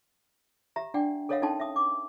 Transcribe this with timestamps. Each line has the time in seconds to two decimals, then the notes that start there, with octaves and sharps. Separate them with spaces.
0.76 G4 E5 A#5
0.94 D4 D5 F#5 G5
1.29 A4 A#4 C#5 D#5 F5 F#5
1.42 C#4 D#4 A4 G5 A5 C6
1.60 E5 D#6
1.76 D6